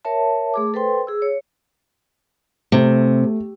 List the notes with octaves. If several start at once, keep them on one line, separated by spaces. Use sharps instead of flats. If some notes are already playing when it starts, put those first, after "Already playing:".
A#4 C#5 E5 A5
A3 G#4 D6
A4 B4 C5 G5 C6
G#4 E6
C#5
C3 A3